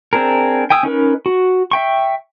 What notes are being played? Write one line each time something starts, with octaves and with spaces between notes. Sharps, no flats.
C4 D4 G#4 A#4
G5 G#5 D#6 E6
C#4 D#4 A#4 B4
F#4
E5 G5 C#6